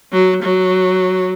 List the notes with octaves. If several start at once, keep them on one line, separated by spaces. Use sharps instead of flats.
F#3
F#3